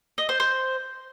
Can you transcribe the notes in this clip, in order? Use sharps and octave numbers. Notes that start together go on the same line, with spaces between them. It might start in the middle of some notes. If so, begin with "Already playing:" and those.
D#5
C5
C5